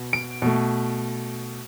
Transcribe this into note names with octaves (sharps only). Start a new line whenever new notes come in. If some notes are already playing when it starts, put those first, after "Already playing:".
Already playing: B2 B3
D7
B2 A3